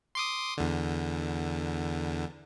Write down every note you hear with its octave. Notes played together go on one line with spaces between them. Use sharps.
C6 D6 D#6
E2 D3